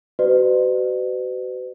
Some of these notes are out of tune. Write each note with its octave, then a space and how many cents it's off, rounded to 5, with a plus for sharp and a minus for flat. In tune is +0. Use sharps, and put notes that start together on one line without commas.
F#4 +35 B4 +40 D5 +45